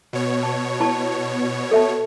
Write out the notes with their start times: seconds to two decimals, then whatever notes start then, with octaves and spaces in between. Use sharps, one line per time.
0.13 B2 C#5
0.43 A5 C#6
0.80 E4 A5 C#6
1.71 A4 E5 A5